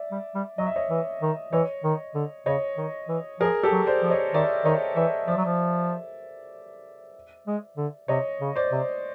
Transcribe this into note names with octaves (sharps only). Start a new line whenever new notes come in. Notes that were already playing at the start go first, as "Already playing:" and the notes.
Already playing: D5 E5
G3
G3
F#3 D#5
E5
C#5 D#5
E3
D#3
E3 C#5 D#5
D#3
D3
C#3 C#5 D#5
D#3
E3
F3 G#4 A#4
G4 A4
F#3
C5 D5
F3
C#5 D#5
D#3 D5 E5
D#3 C#5 D#5
E3 D5 E5
F3 D5 E5
F#3
F3
G#3
D3
C3 C#5 D#5
C#3
C5 D5
C3